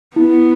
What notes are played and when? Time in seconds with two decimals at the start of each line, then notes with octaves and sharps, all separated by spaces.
0.16 B3 E4